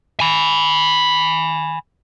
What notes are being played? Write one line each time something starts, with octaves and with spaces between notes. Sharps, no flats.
G#5 B5